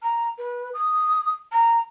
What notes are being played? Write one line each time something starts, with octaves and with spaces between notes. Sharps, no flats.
A#5
B4
D#6
A#5